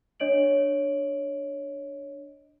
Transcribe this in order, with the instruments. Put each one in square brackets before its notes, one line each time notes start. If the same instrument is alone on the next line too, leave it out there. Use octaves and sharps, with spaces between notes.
[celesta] D4 C#5 D#5 D7 F#7